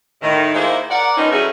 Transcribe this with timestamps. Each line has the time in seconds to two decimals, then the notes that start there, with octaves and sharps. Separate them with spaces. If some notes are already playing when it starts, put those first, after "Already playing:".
0.21 A2 D#3
0.54 D#3 G#3 A#3 E4 F4 C5
0.90 A#4 D5 F#5
1.17 D#3 F3 B3 C#4 D#4
1.31 F#3 G3 A3 C#4 E4 G#4